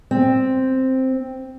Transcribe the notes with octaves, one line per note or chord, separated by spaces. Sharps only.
C4